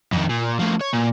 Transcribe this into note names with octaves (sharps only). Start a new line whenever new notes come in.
F2 D#3
A#2
A2 F3
C#5
A#2